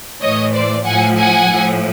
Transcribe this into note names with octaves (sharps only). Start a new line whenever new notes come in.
A2 E3 C#5 D#5
C5 D5
A2 F3 F#5 G#5
F#5 G#5
A2 F3